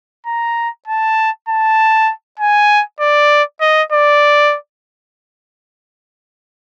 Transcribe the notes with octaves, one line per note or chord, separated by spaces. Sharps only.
A#5
A5
A5
G#5
D5
D#5
D5